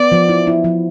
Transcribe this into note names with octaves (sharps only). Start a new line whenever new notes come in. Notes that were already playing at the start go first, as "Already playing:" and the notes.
Already playing: B3 D5
F3
E4
E4
F3